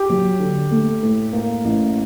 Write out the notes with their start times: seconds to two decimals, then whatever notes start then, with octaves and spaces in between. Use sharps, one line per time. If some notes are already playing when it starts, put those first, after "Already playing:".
Already playing: G4
0.09 F#3
0.40 D3
0.71 A3
1.03 A2
1.33 A#3
1.65 A1